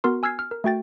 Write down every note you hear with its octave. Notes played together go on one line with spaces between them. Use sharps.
B3 F#4 A#4 C6
G#5 E6 F6 G#6 C7
F6
A#4
A3 F#4 G5 A6